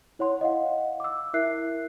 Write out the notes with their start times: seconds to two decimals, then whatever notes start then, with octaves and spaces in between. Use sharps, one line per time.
0.19 E4 C#5 F#5 C6
0.41 D#5 F5 F#5
1.00 D6 E6
1.34 E4 A#4 E5 F#6 C7